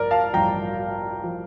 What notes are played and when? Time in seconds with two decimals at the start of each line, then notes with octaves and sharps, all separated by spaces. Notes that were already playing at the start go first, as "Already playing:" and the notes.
Already playing: A1 G2 F3 A#4 D5
0.11 F5 A5
0.33 A1 G2 F3 G5 A#5
1.23 F3